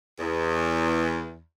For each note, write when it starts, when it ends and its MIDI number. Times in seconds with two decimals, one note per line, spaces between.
0.18 1.39 40